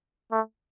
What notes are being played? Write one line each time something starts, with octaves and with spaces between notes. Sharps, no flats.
A3